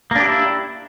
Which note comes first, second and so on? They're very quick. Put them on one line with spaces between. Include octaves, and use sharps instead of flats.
A#3 D4 G4 E4